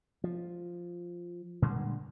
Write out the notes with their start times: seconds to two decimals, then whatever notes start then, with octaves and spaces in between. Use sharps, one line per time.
0.24 F3
1.62 A#2 D3 G3 G#3